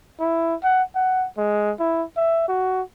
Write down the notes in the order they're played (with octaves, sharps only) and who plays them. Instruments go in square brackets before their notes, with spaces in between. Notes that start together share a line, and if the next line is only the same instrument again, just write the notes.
[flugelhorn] E4
F#5
F#5
G#3
E4
E5
F#4